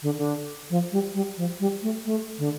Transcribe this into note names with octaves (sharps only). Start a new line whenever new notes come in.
D3
D3
F3
G3
G3
F3
G3
A3
A3
D3